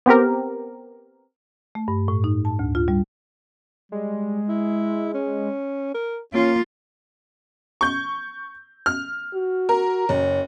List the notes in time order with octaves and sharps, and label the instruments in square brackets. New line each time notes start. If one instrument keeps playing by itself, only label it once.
[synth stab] B3 C4 G4 A#4
[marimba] A3
G2
A2
D#4
A5
D2
F4
G3
[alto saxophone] G3 [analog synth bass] G#3
[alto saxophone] E4
C#4
A#4
[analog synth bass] A#3 [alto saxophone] C#4 [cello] F4
[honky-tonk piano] C#6 G6
F6
[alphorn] F#4
[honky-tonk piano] A#4
[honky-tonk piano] F#1 [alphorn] C#5